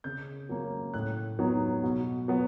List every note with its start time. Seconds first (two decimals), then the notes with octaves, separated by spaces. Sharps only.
0.04 C#3 G6
0.49 F#3 A#3 C#4
0.94 A2 F#6
1.39 F#3 B3 D#4
1.84 B2
2.28 F#3 B3